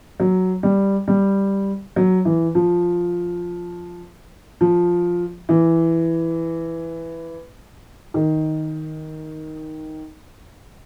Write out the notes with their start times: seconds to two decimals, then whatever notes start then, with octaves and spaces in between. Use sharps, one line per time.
0.20 F#3
0.63 G3
1.08 G3
1.96 F#3
2.25 E3
2.55 F3
4.61 F3
5.49 E3
8.14 D#3